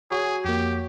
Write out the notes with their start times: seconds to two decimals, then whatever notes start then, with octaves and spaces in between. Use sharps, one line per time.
0.11 F#3 G#4
0.45 F2 A#3 G4